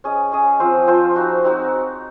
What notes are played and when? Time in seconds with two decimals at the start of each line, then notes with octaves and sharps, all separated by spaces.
0.04 C#4 G#4 D#5
0.32 C#4 G#4 D#5
0.60 F3 C4 F4 C5
0.87 F3 C4 F4 C5
1.16 C4 D#4 F#4
1.44 C4 D#4 F#4